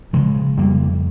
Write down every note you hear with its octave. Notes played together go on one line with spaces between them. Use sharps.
C#3 F3 G#3
F2 G3 A#3